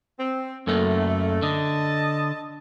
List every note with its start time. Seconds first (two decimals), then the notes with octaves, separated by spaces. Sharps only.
0.19 C4
0.67 F#2 A3 A#3
1.42 D3 D#5 A5